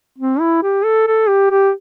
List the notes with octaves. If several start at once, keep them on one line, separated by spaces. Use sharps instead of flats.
C4
E4
G4
A4
A4
G4
G4